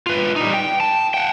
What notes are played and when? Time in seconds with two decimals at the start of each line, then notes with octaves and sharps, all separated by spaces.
0.07 F4 B4
0.36 G3 D#4
0.54 G5
0.80 A5
1.14 F#5 G5